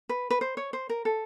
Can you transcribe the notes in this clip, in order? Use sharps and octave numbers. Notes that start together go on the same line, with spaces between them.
B4
B4
C5
C#5
C5
A#4
A4